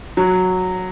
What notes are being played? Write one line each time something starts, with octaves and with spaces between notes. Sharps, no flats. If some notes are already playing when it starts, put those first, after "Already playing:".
F#3